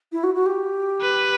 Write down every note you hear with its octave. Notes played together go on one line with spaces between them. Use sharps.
E4
F#4
F#4
G4
B4